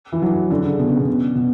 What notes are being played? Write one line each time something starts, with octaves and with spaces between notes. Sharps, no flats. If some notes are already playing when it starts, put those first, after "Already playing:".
E3
F#3
D3
C#3
B2
C#3
B2
B2